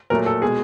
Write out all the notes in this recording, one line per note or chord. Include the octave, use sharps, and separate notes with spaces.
A#2 F#3 A3 A#4
A4
B2 G#3 G#4